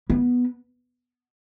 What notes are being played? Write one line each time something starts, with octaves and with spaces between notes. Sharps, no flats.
B3